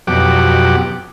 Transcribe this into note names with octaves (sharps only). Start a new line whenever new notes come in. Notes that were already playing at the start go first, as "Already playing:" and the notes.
F2 B2 F#3 G4 F#5 D6